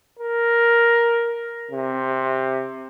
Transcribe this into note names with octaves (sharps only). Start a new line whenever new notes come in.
A#4
C3